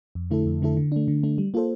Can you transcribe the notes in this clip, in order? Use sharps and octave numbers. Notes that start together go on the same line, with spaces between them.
F2
D3 A3 E4 A4
F2
D3 A3 E4 A4
D3
A3 D4
D3
A3 D4
G3
A#3 F4 A4 C5